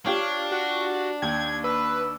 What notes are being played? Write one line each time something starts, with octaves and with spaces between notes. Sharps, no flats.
D4 F4 G4 C#5
F#4 F#5
D#2 G5 G#6
B4 E6